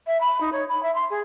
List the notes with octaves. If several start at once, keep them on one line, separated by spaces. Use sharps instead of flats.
E5
B5
D#4
C#5
B5
E5
C6
G#4